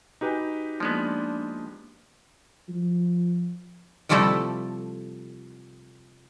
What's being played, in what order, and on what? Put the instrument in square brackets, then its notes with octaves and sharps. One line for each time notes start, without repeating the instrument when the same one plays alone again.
[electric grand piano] D#4 G4 B4 [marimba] F#4 G#5
[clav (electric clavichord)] F3 G#3 B3 [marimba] A#3 [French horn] D4
[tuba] F3
[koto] C3 F3 G3 A3 E4 A4